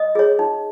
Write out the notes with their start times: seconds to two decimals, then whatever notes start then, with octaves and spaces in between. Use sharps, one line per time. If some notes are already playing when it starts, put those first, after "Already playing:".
Already playing: D#5 D#6
0.15 G#4 C#5
0.39 D#4